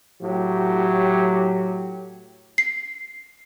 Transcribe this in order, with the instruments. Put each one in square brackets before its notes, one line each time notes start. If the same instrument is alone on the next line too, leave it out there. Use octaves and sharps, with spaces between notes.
[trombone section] A2 F#3 G4
[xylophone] C7